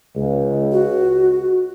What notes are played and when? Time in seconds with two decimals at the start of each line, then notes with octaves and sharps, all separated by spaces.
0.14 C#2
0.72 F#4